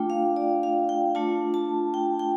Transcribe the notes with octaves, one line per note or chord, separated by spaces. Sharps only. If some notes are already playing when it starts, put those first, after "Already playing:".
Already playing: A3 D4 F4 G5
F5
D5
F5
G5
A3 D4 F4 A5
A5
G5
G5